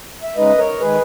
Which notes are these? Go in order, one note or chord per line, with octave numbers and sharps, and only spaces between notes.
E5
C#3 G#3 D#4 B4 D#5
A#4 C#5
D#3 G#3 G#4 B4